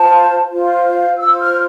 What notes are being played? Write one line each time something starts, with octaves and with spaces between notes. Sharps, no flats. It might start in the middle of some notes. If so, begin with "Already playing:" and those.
Already playing: F4 C5 A5
F4 C5
F5
F4 C5 E6
F6